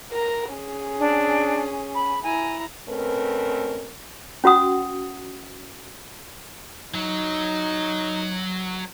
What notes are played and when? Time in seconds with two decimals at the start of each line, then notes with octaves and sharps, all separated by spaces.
0.12 A#4 A#5
0.52 C#4 G#4
0.99 D4
1.94 B5
2.23 E4 G#5 A#5
2.89 B2 A3 C4 C#4 A#4 B4
4.44 C#4 F#4 F#5 D#6
6.95 F#3 D#4